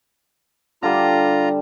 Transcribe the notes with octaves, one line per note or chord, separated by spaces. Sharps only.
D3 G3 F4 A#5